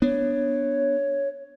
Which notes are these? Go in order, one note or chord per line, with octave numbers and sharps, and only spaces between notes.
B3 D4 C#5